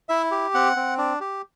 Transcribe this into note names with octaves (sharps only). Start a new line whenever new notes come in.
E4 E5
G4
C4 F#5
C4
D4
G4